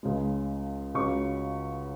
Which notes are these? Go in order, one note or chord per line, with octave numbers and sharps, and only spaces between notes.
C#2 C#3 G#3
C#2 C#3 F#3 C#6